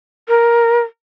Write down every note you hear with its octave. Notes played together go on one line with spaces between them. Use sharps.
A#4